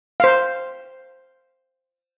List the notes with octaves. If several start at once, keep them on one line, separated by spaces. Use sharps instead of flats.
C5 F5